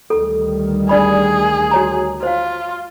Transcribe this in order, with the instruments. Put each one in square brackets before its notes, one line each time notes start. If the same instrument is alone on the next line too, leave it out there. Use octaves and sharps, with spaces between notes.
[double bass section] D2 D#3 G3 [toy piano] A4
[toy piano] D4 D5 B5 [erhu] G#4
[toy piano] F#4 C#5 A#5
[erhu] F4 [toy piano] C5 F5